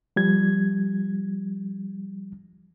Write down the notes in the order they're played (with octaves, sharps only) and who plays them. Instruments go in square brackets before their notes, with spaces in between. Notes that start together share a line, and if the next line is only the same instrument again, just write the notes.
[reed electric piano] F3 G3 G#6